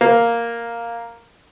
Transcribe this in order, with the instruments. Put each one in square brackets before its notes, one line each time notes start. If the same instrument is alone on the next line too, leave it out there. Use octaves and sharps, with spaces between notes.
[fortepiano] A#3